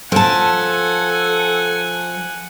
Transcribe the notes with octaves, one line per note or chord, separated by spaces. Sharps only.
F3 A4 F#5 G#5 A5